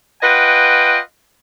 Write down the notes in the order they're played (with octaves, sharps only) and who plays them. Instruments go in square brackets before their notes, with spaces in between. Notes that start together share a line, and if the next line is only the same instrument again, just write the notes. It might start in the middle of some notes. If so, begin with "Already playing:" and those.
[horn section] F4 B4 D#5 F#5 G5